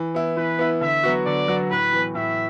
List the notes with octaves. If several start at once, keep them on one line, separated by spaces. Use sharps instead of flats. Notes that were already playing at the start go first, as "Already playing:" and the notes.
Already playing: E3
B3 E4
E3 B4
B3 E4
D3 E5
F#3 B3 F#4
D3 D5
F#3 B3 F#4
A2 B4
E3 B3
A2 E5